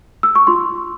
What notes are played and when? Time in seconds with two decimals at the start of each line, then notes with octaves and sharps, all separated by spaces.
0.23 E6
0.35 C#6
0.47 F4 C6